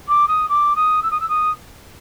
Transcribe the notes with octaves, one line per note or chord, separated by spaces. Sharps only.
D6
D#6
D6
D#6
E6
D#6
E6
D#6